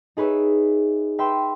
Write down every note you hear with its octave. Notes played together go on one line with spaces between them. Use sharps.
D#4 G#4 B4 C#5 E5
B4 E5 G5 B5 C6